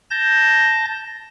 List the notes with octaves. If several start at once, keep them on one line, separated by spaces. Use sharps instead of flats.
A5 G6 A#6